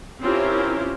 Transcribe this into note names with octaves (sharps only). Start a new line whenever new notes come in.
C4 C#4 E4 F4 G4 A#4